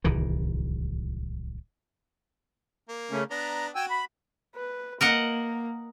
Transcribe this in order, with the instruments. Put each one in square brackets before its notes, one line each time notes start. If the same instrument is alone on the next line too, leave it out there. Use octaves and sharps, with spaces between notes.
[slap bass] D1 C2 D#3 E3
[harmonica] A#3
[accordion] C#3 A3 C#4
[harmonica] B3 D4 [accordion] A#5
[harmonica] F#4 [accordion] G5 G#5 E6
[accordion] B5
[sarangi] B4
[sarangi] A#3 [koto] A#4 D#5 F#5